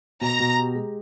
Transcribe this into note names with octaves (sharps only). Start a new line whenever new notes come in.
B2 A#5
B2
G4
G#3